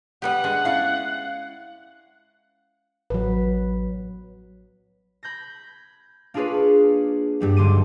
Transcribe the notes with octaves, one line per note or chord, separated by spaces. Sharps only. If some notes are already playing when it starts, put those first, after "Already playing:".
G3 B3 G4 F#5
G#3 D4
C#4 E4 D5 F5
A1 F#3 B4
B5 G6 G#6 A#6
A#3 D4 F4 G#4 B4 C#5
G2 G3 B3
B1 D3 C6 D6 D#7